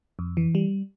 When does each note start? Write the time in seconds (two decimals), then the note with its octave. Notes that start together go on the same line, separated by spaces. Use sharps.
0.19 F2
0.37 E3
0.55 G3